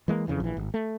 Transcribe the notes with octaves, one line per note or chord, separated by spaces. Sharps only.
E3 G#3 A#3
F2 C#3 E3
A#1 E3
G#1
A3